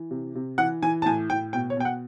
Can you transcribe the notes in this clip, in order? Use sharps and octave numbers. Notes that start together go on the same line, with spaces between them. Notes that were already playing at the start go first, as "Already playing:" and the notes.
Already playing: E3
C3
C3
E3 F#5
E3 G#5
A5
A2 G#5
A2 G5
B2 G5
C#5
B2 G5
F#5